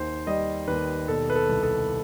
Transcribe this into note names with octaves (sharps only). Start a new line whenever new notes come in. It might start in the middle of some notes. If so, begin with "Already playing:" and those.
Already playing: D#2 D#3 C5
G3 D#5
D#2 B4
B2 A4
B4
A4
C2
A4